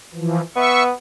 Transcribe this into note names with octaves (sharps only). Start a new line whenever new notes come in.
E3 F3
B3 E5 C#6